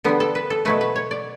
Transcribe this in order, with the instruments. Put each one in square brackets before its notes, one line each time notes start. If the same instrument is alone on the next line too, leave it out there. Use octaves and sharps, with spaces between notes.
[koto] D3 G3 B3
A4
B4
A4
B2 F#3 A3 B4
B4
C#5
D5